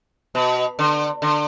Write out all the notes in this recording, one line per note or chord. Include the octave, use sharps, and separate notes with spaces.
B2
D3
D3